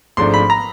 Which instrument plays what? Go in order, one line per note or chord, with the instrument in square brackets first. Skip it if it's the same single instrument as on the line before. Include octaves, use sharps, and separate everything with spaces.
[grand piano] G#1 G#2 F3 A3 D4 [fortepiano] C6
[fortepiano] B5
A#5